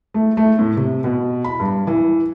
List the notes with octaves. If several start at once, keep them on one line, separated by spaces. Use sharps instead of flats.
A3
A3
A2
C3
B2
B5
G2
E3